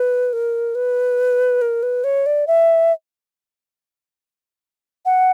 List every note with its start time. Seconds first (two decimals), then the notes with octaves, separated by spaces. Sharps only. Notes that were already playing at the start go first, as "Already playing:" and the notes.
Already playing: B4
0.33 A#4
0.75 B4
1.61 A#4
1.83 B4
2.04 C#5
2.26 D5
2.47 E5
5.05 F#5